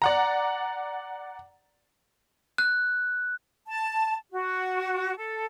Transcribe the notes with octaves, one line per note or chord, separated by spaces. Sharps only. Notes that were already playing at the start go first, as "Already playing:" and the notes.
D5 F#5 A#5
F#6
A5
F#4
A4